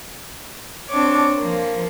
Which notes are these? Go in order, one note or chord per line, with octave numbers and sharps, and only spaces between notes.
C4 D4 C#5 D6
F3 A#3